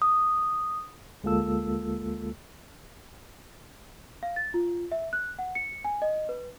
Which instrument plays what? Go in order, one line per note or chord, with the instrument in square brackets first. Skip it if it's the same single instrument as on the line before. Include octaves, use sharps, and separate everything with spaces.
[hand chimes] D#6
[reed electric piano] D2 G#3 A#3 F4 A4 E6
[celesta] F5
A6
F4
E5
F#6
F#5
C#7
G#5
D#5
B4